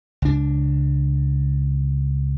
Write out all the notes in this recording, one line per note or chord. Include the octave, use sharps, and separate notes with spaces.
C#2 D4